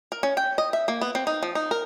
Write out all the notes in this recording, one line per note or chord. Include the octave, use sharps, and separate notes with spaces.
A#4
C#4
G5
D#5
E5
A#3
B3
C4
D#4
F3
D#4
A#4